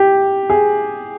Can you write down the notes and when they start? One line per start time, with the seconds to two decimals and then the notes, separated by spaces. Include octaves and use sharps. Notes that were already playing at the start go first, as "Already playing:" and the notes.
Already playing: G4
0.50 G#4